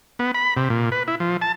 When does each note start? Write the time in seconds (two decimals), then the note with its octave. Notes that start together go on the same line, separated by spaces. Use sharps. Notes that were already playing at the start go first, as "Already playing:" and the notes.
0.19 B3
0.35 B5
0.57 C3
0.70 A#2
0.92 B4
1.08 E4
1.20 F3
1.42 A5